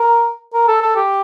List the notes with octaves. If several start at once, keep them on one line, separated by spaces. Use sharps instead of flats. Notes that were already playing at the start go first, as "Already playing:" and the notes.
Already playing: A#4
A#4
A4
A4
G4